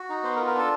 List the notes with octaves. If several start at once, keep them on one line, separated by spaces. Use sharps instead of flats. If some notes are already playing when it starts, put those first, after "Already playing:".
Already playing: F#4
D#4
B3 C5
A#4
F4
A#4
D4 A4